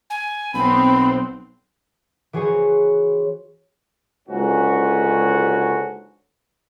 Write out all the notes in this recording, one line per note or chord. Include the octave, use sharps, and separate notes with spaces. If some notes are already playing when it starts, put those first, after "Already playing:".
G#5
B1 B3 C4 C5 B5
E3 F#4 G#4 C5 C#5
F#1 C#2 G#2 D3 C#4 F#4